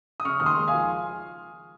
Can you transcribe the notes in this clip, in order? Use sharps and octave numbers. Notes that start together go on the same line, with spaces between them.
D#6
C#3 C#6 F6
D#2 F6
C6 D#6
G#3
F5 G#5
F3